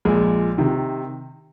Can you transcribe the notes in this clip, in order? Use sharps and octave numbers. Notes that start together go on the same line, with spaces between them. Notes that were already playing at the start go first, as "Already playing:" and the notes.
A#1 A#2 G#3
C3 D#3